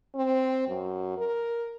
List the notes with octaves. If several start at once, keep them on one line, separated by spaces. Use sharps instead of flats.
C4
F#2
A#4